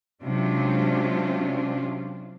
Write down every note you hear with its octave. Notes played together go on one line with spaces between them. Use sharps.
C3 F#3 G#3 C#4 D4 F4